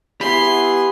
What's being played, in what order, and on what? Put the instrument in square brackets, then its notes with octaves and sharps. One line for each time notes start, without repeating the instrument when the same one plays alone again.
[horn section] B3 E4 G#4 [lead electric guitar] G4 B5 [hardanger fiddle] C6